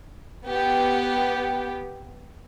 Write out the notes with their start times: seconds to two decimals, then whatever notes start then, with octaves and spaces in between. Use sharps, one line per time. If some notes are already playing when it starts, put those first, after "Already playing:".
0.48 B3 G4